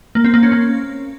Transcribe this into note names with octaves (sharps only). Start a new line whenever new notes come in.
A#3
C4
A#3
C#4
A#3